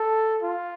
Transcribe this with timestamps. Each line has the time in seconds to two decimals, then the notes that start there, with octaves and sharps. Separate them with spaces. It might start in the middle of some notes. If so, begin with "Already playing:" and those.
Already playing: A4
0.42 F4